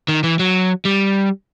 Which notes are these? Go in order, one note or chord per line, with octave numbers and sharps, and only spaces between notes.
D#3
E3
F#3
G3